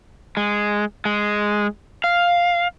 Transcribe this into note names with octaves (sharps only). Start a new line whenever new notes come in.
G#3
G#3
F5